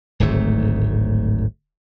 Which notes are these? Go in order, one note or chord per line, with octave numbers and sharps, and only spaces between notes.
D1 G#1 G#2 A3